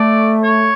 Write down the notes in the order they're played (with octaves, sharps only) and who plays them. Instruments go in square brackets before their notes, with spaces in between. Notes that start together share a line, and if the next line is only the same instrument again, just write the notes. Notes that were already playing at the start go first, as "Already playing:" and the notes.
Already playing: [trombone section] A3 [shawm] D5
[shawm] C#5